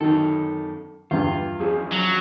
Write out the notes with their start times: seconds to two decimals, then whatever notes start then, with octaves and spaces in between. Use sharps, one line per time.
0.01 F#2 D#3 A4
1.11 E2 G2 F4
1.60 E2 F3 C#4 G#4
1.92 F#3